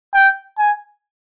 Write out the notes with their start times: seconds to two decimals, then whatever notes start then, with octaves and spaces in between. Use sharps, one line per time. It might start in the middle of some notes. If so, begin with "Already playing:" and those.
0.14 G5
0.58 G#5